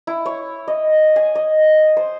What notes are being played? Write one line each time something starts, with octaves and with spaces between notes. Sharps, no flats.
E4
C#5
D#5
G#5
D#5
C5